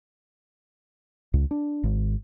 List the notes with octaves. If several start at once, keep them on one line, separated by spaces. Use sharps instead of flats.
C#2
D4
G#1